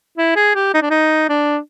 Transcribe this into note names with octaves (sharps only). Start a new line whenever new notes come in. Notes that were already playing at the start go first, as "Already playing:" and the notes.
E4
G#4
G4
D#4
D4
D#4
D4